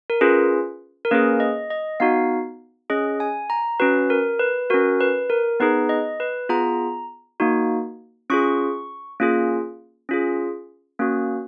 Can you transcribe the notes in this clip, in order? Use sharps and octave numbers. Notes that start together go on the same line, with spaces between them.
A#4
C#4 F4 G#4 B4
A#4
A#3 C#4 G#4 B4
D#5
D#5
B3 D#4 F#4 F5
C#4 G#4 D#5
G#5
A#5
C#4 F#4 B4
A#4
B4
C#4 F#4 A#4
B4
A#4
B3 D#4 G#4 B4
D#5
B4
B3 F4 G#4 A#5
A#3 D#4 F#4
C#4 F4 G#4 C#6
A#3 C#4 F4 G#4
C#4 F4 G#4
A#3 C#4 F#4